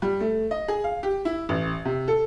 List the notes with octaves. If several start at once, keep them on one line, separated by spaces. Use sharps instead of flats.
G3
A3
D#5
G#4
F5
G4
E4
A1
C3
A4